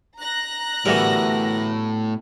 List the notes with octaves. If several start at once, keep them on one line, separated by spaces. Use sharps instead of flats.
A#5 F#6 A#6
A2 D3 E3 G3 B3 F#4 A#4